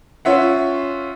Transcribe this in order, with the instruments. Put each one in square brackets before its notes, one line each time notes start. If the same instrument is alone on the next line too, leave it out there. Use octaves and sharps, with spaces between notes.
[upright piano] C#4 F4 E5 F#5